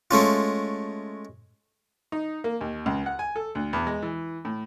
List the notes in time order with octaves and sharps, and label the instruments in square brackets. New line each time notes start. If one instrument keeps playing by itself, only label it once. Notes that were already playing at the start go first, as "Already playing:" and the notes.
[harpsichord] G#3 A3 C#4 F4
[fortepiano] D#4
A#3
D#2
C#2
F#5
G#5
A4
D2
E2
G#3
E3
A2